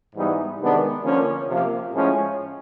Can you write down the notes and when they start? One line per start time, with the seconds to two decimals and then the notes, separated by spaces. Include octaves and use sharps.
0.15 G#2 E3 G3 B3 D#4
0.60 C3 D#3 G#3 B3 D4
1.04 D3 F3 A#3 C#4
1.49 C3 F3 A#3
1.93 A2 F3 G#3 C#4